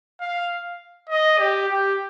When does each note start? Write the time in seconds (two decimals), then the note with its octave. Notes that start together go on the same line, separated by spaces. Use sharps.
0.20 F5
1.09 D#5
1.39 G4
1.68 G4